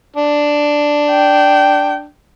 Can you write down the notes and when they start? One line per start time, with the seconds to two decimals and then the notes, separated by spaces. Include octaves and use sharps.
0.16 D4
1.10 G5